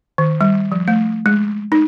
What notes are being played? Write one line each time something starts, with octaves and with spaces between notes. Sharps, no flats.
D#3
G3
F3
A3
G#3
D#4